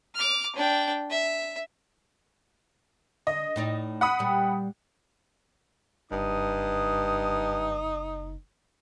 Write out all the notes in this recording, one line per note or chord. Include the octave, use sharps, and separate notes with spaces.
D6 F6
D4 G5
E5
D3 D#5
A2 D#4 D5
F#5 B5 D#6
A#2 G3
F#1 G2 D#4 D#6